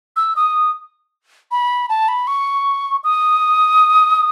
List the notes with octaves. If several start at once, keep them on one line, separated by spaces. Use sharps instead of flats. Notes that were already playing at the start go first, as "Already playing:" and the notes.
E6
D#6
B5
A5
B5
C#6
D#6